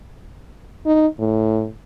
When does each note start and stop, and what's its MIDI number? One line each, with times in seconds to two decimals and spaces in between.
0.86 1.07 63
1.19 1.68 45